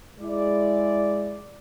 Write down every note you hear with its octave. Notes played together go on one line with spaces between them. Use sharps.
G#3 E4 D5